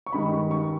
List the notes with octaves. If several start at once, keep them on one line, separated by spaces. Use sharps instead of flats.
C#6
G2 D#3 G#3 B5
C#6